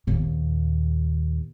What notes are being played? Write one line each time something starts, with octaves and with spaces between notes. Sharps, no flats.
D#2 A#2